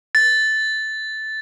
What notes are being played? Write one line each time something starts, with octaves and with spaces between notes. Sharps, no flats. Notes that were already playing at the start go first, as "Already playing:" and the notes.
A6